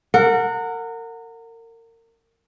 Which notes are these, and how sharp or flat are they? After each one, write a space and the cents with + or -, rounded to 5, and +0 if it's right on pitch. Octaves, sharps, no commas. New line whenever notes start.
A#4 -30 F#5 -15